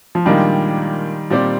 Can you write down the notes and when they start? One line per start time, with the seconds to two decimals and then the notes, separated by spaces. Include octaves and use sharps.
0.15 F3
0.26 A#2 D#3 G3 G#3 D4 F4 A#4
1.30 A#2 G3 C4 G4 D5